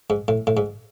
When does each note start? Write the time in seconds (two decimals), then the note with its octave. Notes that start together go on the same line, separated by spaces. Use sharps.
0.10 G#2
0.28 A2
0.47 A2
0.57 G#2